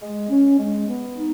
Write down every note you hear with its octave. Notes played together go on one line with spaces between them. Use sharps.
G#3
C#4
G#3
B3
D#4